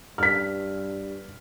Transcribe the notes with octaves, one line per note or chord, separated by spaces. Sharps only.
G2 F6 B6